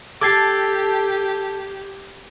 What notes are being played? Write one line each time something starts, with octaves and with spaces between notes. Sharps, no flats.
G4 A4 D6 G#6 C7